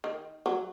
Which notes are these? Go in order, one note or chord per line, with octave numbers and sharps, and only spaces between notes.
D#3
F#3